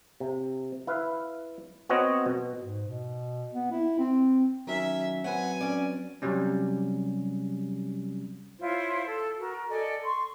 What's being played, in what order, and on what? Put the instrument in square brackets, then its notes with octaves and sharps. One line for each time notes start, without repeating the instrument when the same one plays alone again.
[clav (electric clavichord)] C3
E4 B4 F5
B3 C4 F#4 C#5 D#5
B2
[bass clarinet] G#2
B2
B3
E4
C4
[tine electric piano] D#3 F#3 C#4 [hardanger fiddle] E5
[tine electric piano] F#3 C4 B4 [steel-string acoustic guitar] F#5 [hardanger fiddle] G#5
[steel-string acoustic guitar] C#4 D5
[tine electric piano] C3 F#3 G3 C#4
[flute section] E4 F4 C5 C#5
A4
F#4 A#4
A4 D5 D#5 G#5
C6 C#6